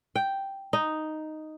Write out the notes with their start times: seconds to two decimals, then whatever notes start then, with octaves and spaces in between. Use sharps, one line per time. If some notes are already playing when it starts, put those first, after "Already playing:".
0.16 G5
0.73 D#4